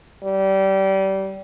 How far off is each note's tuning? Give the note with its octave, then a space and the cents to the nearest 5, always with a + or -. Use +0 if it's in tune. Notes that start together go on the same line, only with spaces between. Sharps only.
G3 -25